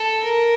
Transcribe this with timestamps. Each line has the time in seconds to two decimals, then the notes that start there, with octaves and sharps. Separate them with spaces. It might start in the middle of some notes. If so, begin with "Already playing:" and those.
Already playing: A4
0.24 A#4